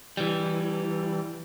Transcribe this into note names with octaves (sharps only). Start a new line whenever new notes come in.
E3 G3